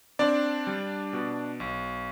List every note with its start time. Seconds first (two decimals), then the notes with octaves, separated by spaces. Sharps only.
0.19 C4 D4 D5
0.67 G3
1.13 B2
1.60 B1